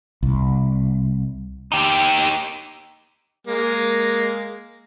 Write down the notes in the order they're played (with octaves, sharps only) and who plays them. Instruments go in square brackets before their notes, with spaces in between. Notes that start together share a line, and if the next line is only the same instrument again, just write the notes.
[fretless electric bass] C2
[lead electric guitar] D#4 G4
[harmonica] G#3 A#3